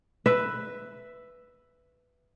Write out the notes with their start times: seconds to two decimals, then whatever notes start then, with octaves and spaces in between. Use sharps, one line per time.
0.26 B4 E5